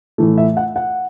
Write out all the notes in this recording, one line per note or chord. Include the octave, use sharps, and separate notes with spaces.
A2 E3 A3
E5
F#5
F#5